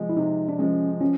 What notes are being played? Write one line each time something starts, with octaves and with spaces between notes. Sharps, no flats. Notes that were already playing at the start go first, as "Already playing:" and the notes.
Already playing: C3 F3 G#3
E4
C3 D#4
D4
F3 G#3 C#4
F3 C#4